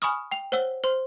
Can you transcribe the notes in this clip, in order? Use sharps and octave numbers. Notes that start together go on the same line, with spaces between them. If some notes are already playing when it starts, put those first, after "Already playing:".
G#5 B5 C#6 D#6 F6
G5 F7
C5 C#5 F#5 E6 G7
C5 C6